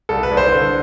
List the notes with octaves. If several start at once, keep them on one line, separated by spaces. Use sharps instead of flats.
C2 A4
B4
C2
C5
D3